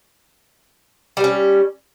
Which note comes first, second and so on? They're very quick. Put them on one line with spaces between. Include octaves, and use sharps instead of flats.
G3 B3 C#4